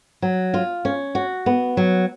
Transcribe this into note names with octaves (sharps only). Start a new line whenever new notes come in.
F#3
F4
C#4
F#4
B3
F#3